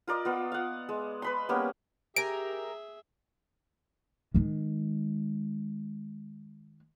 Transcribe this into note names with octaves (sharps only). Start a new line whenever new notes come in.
F4 A#4 D5 D#5
B3 F4
F5 F#5
G#3
B4 B5 C6
G3 A#3 B3 C#4
G4 G#4 A#4 E5 G#5 D7
D#3 G#3